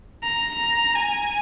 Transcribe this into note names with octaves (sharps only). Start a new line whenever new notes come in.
A#5
G#5